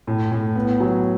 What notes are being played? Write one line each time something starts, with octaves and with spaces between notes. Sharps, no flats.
A2
A2
B3
F#3